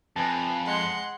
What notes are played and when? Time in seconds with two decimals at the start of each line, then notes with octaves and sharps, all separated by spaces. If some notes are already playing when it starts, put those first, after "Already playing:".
0.16 F2 B4 G#5 A5
0.66 G#3 F#5 C6